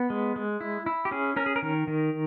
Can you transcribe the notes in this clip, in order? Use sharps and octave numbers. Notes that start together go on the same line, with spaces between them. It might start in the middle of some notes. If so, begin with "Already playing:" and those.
Already playing: B3
G#3
G#3
E4
E4
G4
C#4 G#4
C#4 A#4
G#4
A#4
D#3
D#3